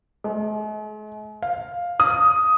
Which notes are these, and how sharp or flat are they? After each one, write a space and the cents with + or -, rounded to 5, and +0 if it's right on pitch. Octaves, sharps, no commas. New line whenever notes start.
G#3 +45
F5 +5
D#6 +10